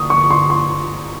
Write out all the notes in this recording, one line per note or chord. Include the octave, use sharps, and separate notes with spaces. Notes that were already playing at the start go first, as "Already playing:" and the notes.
Already playing: C#6 D#6
C#6
C6
C6